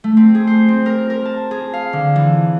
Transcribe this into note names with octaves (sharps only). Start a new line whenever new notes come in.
A3
C4
G#4
C5
C4
A#4
A#4
A5
G#4
F5
D3
E3